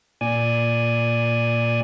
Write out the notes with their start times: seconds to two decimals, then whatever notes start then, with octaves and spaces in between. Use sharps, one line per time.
0.21 A#2 D5 G#5